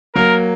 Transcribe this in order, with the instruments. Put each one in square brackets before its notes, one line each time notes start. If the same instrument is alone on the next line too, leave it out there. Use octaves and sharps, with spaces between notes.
[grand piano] F#3 A#3 [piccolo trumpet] A#4